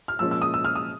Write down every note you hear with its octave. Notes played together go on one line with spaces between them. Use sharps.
F6
A#2 F3 G#3 C#4 E6
E6
D#6
E6
F6
D#6